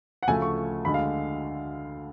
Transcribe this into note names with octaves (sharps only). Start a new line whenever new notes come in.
F#5
D2 C#3 F3 A3 G#5
C#6
D2 D3 G#3 B5
F5